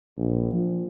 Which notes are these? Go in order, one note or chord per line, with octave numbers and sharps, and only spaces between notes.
A#1
F3